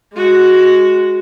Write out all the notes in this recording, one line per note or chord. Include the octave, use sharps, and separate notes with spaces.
G#3 F#4